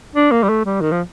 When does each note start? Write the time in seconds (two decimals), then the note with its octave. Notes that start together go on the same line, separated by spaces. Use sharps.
0.15 D4
0.31 A#3
0.43 G3
0.49 A3
0.65 G3
0.81 D#3
0.91 F3